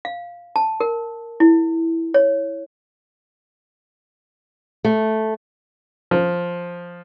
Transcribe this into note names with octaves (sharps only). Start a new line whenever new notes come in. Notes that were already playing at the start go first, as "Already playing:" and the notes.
F5
A5
A#4
E4
C#5
A3
F3